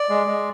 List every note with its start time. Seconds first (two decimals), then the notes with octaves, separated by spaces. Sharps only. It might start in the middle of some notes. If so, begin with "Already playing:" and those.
Already playing: D5
0.09 G#3
0.27 G#3